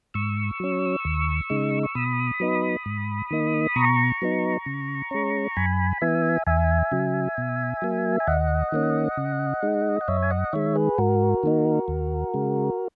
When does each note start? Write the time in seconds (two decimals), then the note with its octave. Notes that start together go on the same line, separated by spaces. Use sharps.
0.14 G#2 C#6 E6
0.60 F#3 C#4
1.05 D#2
1.50 C#3 G#3 D#4
1.83 C#6
1.95 B2 B5 D#6
2.40 F#3 B3 D#4
2.86 G#2
3.31 D#3 A#3 D#4
3.76 B2 A#5 C#6
4.22 F#3 B3 D#4
4.66 C#3
5.11 G#3 C#4
5.56 F#2 G#5 B5
6.01 E3 B3 E5 G#5
6.47 E2 E5 G#5
6.92 C#3 F#3
7.37 B2
7.82 F#3 A#3
8.20 G#5
8.27 D#2 D#5 F#5
8.72 D#3 A#3 C#4
9.17 C#3
9.63 G#3 D#4
10.01 F#5
10.08 F#2 C#5 E5
10.22 G#5
10.31 D#5 F#5
10.53 D#3 G#3 C#5 E5
10.76 G#4 B4
10.98 G#2 F#4 A#4
11.43 D#3 A#3 D#4
11.88 D#2
12.34 C#3 G#3